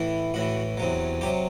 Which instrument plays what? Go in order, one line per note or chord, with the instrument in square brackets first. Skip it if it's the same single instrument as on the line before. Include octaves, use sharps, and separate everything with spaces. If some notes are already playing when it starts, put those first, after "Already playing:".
Already playing: [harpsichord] A2 E3
A2 E3 F#4
E2 C3 F#3
C3 F#3 G4